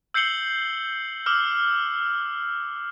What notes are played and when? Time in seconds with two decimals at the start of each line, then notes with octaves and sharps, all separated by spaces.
0.14 E6 G6 C7 C#7 F#7 G7
1.26 D6 E6 F6